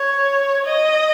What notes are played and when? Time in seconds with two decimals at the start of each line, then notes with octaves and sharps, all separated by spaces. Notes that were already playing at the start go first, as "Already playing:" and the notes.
Already playing: C#5
0.66 D#5